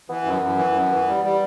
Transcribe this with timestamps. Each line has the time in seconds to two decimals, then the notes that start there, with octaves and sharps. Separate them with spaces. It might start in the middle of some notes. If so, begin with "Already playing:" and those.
0.09 E3 B3
0.25 F#2
0.42 F#2
0.58 E3
0.74 F#2
0.91 E3
1.08 G3
1.24 G3